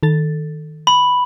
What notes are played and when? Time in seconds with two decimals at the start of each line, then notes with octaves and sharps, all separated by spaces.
0.03 D#3 A4 A6
0.87 B5